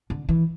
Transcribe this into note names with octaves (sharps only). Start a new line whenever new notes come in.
D3
E3